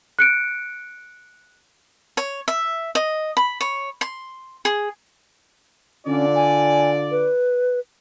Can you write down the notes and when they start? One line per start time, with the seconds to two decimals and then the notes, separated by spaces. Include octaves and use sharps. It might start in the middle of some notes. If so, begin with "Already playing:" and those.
0.19 F#6 C#7 D7
2.17 C#5
2.48 E5
2.95 D#5
3.37 B5
3.61 C#5
4.01 C6
4.65 G#4
6.06 D3 C#4 F4 D5
6.35 G#5
7.11 B4